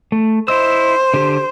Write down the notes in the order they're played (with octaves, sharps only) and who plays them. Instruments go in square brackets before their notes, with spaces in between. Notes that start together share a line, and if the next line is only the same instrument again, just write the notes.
[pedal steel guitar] A3
[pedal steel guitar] E4 D#5 E6 [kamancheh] C5
[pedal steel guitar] D3 G4